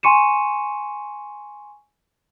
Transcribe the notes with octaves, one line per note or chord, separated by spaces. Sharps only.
G#5 C6 C#6 C#7 D#7 E7